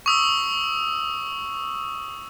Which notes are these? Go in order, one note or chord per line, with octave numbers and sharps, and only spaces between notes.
C#6 D#6 E6